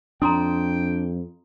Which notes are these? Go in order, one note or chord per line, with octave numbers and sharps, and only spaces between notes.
F2 D4 G5 A#5 C6 D#6